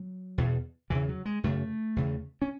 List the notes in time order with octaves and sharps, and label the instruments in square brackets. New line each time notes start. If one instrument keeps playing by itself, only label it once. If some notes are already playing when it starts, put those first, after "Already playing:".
Already playing: [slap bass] F#3
E2 B2
E2 C#3 E3
F#3
G#3
F#2 C#3 A3
E2 C#3
C#4